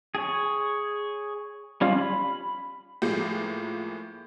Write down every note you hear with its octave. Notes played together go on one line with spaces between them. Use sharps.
G#4 C#5
G3 C#4 F4
B5
A2 F3 G#3 A#3